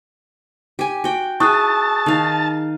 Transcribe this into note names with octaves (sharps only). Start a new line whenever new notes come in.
G4 G#5
F#4 G5
E4 G#4 A5 C#6 D#6 F#6
D#3 F5